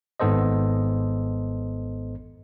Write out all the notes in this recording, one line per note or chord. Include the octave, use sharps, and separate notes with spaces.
G#1 G#2 B3 A4 C5 D#5